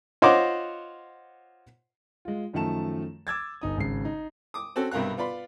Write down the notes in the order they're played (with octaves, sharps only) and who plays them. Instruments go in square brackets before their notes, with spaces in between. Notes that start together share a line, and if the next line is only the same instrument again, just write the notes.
[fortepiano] F4 C5 C#5 D#5 F#5 D6
[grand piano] G#3 F4
F#2 D#3 F3 A3 A5 E7
D6 E6 G#6 A6
G1 D#4 D#6
G#1 C#3 C7
D#4
[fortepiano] D6 D#6
C4 C#4 F#4 A4
B1 G2 C3 A#4 F5 F#6
B3 F4 D5 B5 C6